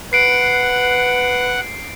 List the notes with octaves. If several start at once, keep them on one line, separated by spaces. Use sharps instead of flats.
B4 F#5 C7 D7